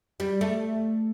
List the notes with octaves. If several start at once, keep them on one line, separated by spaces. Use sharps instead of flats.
G3
A3